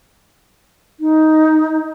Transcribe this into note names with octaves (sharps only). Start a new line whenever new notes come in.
D#4